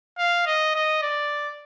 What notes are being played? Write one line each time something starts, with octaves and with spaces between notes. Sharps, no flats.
F5
D#5
D#5
D5